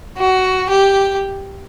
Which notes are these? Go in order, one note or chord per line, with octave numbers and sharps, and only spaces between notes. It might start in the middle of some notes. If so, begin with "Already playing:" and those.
F#4
G4